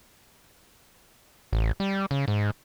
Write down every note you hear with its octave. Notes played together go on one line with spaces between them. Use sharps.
A1
G3
C#3
G#2